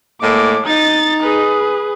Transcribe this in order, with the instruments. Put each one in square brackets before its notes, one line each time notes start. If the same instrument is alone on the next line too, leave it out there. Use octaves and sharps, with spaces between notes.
[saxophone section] A2 G#3 A#3 [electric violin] D6
[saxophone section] D#4 [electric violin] A6
[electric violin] G#4 B4